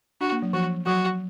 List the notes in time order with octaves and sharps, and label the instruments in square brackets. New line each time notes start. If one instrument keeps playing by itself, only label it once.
[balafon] D4 [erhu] F#4
[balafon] A#3
F#3
[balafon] F3 [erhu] F#4
[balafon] F#3 [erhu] F#4